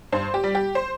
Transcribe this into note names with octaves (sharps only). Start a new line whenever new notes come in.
G2 C5
G4
G3
G4
C5